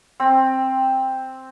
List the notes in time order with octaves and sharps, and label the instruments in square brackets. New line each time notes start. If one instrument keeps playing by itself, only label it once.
[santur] C4